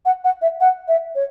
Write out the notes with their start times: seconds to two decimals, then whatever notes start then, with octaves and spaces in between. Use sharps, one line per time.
0.05 F#5
0.24 F#5
0.42 E5
0.61 F#5
0.88 E5
1.15 C#5